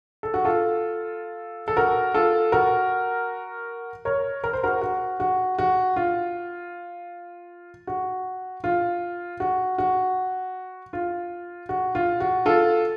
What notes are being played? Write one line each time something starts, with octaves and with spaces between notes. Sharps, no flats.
A4
F#4
F4 A4
A4
F#4 A#4
F4 A4
F#4 A#4
A#4 C#5
A#4
C5
F#4 A#4
F#4
F#4
F#4
F4
F#4
F4
F#4
F#4
F4
F#4
F4
F#4
F4 A4